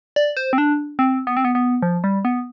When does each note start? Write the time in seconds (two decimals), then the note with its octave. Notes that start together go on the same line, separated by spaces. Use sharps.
0.16 D5
0.37 C5
0.53 C4
0.58 D4
0.99 C4
1.27 B3
1.37 C4
1.45 B3
1.55 B3
1.83 F3
2.04 G3
2.25 B3